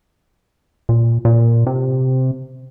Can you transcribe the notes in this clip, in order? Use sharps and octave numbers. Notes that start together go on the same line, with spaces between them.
A#2
A#2
C3